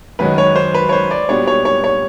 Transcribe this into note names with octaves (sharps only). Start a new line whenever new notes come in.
F#2 D#3 G#3 C#4 F#4 B4
C#5
C5
B4
C#5
C5
D5
A#2 G3 B3 D4 F#4 C#5
C#5
C#5
C#5